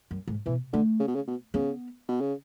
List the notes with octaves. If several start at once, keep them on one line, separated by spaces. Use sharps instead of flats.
F#2
G#2
B2 E3
D3 A3
C#3
B2
C#3
B2
C#3 B3
B2
C#3